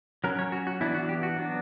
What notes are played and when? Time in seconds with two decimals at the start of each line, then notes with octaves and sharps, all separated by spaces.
0.24 F#3 C#4 A#4
0.39 C#5
0.52 F#4
0.67 F#4
0.81 E3 B3 D4 E4
0.95 F#4
1.09 G4
1.23 F#4
1.37 F#3 B3 D4